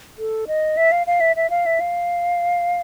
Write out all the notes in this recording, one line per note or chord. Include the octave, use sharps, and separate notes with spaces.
A4
D#5
E5
F5
F5
E5
E5
F5
E5
F5